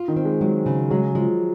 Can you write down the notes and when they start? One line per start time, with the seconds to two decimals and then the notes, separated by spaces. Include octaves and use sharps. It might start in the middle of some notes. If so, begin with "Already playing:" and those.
Already playing: F4
0.08 D#3
0.16 C4
0.25 G#3
0.41 F#3 G#3
0.66 C#3
0.90 F#3 G#3
1.15 F3 G#3